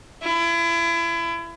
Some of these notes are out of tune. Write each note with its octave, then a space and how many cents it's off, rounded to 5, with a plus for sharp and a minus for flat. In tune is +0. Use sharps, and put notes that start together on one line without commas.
E4 +35